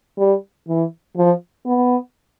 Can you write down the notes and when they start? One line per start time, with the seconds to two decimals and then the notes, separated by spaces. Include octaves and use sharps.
0.18 G3
0.68 E3
1.17 F3
1.66 B3